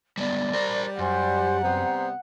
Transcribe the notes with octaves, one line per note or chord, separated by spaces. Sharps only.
G3 G#3 B3 D5
G3 A#4 C5
F#2 C5 F#5 G#5 C6
C3 G3 B3 C5 A#5